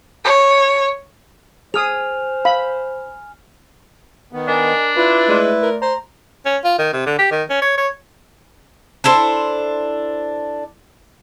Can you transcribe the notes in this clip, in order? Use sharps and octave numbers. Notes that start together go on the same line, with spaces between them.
C#5
G#4 C5 G#5 D#6 F6 F7
F5 B5
D#3 B3
D4 A#4 D#5 G#5
E4 F4 B4 D5
G#3 A3 D5 C6
A#4
C5 A#5
C#4
F4
D#3
C3
D3
G4
D#3
C#4
C#5
C#5
D4 E4 A4 C5